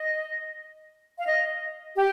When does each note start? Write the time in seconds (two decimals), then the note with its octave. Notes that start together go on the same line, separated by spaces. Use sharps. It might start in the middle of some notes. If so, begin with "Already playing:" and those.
Already playing: D#5
1.18 F5
1.25 D#5
1.96 G4